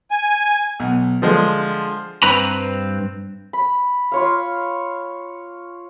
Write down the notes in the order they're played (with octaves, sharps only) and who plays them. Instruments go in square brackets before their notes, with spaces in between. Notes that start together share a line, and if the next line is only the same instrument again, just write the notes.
[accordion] G#5
[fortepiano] B1
D3 F3 G#3
[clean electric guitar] G2 C4 B4 A#5 B5
[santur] B5
F4 C#5 F5